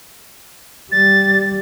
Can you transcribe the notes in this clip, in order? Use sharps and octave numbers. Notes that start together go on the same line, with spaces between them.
G3 A6